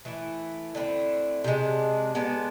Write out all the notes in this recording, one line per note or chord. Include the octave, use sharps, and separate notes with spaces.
E3 A3 E4
D3 A3 C4 E4
C3 F3 G#3 D4
G#3 B3 D4 A4